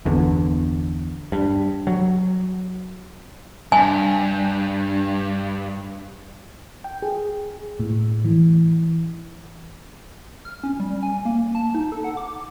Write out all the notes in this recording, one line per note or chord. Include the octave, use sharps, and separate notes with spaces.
G1 E2 D3
G2
F#3
G2 G#5
G5
G#4
A2
E3
F6
C#4
G3
G#5
A#3
A5
D#4
A4
F#5
D6